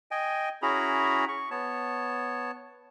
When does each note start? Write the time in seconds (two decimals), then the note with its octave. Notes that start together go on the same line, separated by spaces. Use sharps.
0.11 D#5 G5 G#5
0.62 C#4 E4 F#4 G#4 A#5 B5
1.28 C#6
1.51 B3 C#5 A5